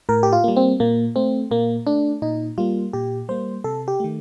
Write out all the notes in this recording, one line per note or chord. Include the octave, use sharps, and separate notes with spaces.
A2 A#4
G4
F4
G3 A#3
C4
A#2 A#3
A3 C4
A#2 A#3
A3 D4
A#2 D#4
G3 A#3 F4
A#2 G4
G3 A#3 C5
C3 A4
G4
D#3 A3